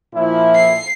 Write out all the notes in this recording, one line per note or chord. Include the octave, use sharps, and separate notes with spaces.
A#2 F3 E4
C7